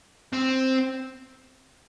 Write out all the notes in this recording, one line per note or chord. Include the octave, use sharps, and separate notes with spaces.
C4